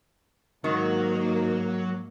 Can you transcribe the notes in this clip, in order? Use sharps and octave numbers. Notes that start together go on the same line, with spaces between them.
G#2 D#3 F#3 A#3